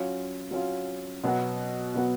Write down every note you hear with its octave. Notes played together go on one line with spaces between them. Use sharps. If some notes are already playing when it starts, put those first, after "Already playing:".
Already playing: F#3 C#4 F4
F#3 C#4 F4
B2 F#3 B3 F#4
B2 F#3 B3 F#4